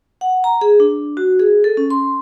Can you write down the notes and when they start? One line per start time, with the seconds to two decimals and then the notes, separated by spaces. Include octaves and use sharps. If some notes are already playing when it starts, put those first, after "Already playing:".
0.21 F#5
0.44 A#5
0.61 G#4
0.80 D4
1.17 F#4
1.40 G#4
1.64 A4
1.77 C#4
1.90 C6